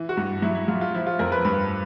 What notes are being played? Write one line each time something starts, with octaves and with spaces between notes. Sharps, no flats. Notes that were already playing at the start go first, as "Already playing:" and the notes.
Already playing: E3
F#4
G2
F#3 E4
E4
F#3 F4
F4
F3 E4
F4
F2 A#4
B4
G2 B4